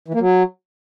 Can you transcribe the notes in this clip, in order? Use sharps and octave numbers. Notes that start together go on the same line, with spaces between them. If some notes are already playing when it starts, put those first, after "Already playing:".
E3
A#3
F#3